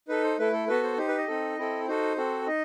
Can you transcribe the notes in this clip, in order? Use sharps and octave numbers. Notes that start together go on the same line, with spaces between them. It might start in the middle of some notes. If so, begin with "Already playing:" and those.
D#4 A4 B4
C5
A3 E4 A4 B4
A4
B3 F#4 A4 B4
C5
D#4 G4 C5
B4
D#5
C4 D#4 A4
C4 E4 A4
D#4 F#4 A4 C5
C4 F#4 A4
D#4 D#5